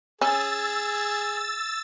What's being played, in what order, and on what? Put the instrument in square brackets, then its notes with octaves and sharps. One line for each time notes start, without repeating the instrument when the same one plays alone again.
[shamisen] C#4 [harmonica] G#4 [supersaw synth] E6 A6